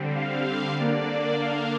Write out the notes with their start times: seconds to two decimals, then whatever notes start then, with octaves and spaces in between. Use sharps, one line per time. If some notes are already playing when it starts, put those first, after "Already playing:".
Already playing: D3 G3 C4
0.15 F5
0.79 D3 A#3 D4 D5
1.09 D5
1.41 F5